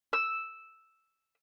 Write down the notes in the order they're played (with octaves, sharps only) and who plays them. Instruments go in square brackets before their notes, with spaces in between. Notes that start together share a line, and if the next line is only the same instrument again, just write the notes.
[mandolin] E6